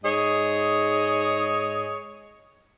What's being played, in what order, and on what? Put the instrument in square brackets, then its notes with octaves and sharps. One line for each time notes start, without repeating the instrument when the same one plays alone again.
[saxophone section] G#2 G#4 C#5 D#5